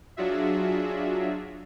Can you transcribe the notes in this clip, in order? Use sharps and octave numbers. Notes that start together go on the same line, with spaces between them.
F#3 D4 F4 F#4 G#4 E5